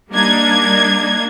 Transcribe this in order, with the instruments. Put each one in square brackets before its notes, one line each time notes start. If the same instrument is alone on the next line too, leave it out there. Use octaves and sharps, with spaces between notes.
[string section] G3 A#3 D4 D#4 G#6